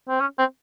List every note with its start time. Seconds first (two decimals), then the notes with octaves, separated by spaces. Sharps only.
0.09 C4
0.20 C#4
0.39 C4